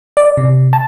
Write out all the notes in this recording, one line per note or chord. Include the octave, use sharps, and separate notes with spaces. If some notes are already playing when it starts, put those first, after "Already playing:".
D5
C3
A5